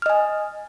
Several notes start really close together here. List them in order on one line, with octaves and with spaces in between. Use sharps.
F6 D#5 G#5